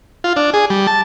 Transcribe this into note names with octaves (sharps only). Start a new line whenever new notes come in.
F4
D4
G#4
G3
A5